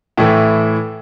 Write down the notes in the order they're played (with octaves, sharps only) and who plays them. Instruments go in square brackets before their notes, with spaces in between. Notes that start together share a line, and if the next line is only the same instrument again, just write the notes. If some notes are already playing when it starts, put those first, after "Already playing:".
[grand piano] A2 E3 A3 E4